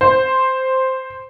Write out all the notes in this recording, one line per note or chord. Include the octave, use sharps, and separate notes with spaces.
C5